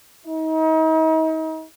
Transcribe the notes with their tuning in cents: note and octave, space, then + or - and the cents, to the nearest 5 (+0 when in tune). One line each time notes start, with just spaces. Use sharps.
D#4 +40